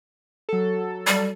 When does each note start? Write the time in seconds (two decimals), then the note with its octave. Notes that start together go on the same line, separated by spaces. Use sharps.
0.49 F#3 A4
1.07 G3